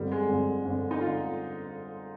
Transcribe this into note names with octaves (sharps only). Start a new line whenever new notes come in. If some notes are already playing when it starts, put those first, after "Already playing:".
Already playing: G1 F2 D3 G3
G#3
G1 F2 D3
G1 F2 D3
D#4
F4
D3